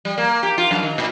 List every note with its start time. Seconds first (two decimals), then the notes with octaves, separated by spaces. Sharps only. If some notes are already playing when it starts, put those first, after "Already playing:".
0.05 G3
0.18 A#3
0.43 G4
0.58 F4
0.71 F#2
0.83 D#3
0.98 A#2